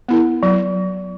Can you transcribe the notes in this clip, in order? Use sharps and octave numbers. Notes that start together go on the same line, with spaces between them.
B3 E4 A#4
F#3